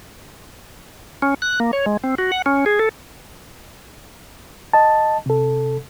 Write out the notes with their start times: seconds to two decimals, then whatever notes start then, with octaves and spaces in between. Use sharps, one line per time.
1.22 C#4
1.42 F#6
1.60 A#3
1.73 C#5
1.86 G#3
2.04 C4
2.18 F#4
2.32 F#5
2.46 C#4
2.66 G#4
2.79 A4
4.73 D#5 A5
5.26 C3 A4